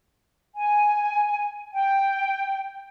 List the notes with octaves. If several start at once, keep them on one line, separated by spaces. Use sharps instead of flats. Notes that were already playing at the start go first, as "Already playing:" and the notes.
G#5
G5